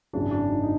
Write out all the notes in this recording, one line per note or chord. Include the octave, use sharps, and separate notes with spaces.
G#1 F#2 C#3 E3 D4
D4
D#4
D#4